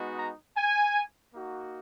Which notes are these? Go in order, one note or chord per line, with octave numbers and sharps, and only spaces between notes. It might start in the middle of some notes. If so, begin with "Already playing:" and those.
Already playing: G#3 B3 D#4 F#4
A#5
G#5
A#3 D#4 F#4